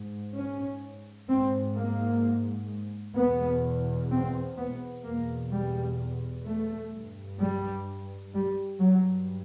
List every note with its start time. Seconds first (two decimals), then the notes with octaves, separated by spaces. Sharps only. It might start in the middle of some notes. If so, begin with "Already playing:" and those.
Already playing: G#2
0.34 C#4
1.27 G#2 C4
1.75 A#3
3.16 E2 B2 B3
4.10 C4
4.57 B3
5.04 E2 B2 A#3
5.51 G3
6.45 A3
6.92 G2
7.39 G3
8.33 G3
8.79 G2 F#3